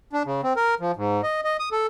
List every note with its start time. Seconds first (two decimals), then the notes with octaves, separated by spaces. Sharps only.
0.13 D4
0.26 C#3
0.44 C4
0.56 A#4
0.80 F3
0.96 G#2
1.23 D#5
1.44 D#5
1.59 D#6
1.72 A4